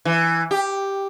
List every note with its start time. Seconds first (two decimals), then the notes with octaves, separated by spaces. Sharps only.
0.05 E3
0.51 G4